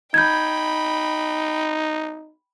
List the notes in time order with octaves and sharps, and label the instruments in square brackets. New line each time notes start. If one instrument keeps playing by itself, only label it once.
[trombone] D#4 [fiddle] G5 B5 [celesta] G6 G#6